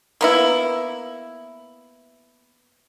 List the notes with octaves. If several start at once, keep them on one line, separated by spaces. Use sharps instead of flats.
A#3 B3 E4